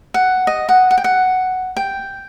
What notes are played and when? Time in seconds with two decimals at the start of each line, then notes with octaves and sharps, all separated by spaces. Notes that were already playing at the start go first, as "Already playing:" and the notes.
0.14 F#5
0.47 D#5
0.69 F#5
0.91 F#5
0.98 G5
1.04 F#5
1.77 G5